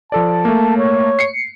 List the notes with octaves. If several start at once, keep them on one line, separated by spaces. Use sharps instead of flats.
F3 A4 D5 A5
A3 A#3
C#5
C7 C#7